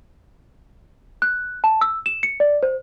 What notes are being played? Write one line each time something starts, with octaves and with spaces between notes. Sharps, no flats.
F#6
A5
E6
E7
C#7
D5
C5